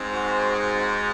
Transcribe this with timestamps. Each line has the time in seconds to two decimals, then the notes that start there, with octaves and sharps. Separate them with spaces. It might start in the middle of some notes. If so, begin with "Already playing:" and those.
Already playing: G#2 C4 C5
0.13 F#4
0.57 F#4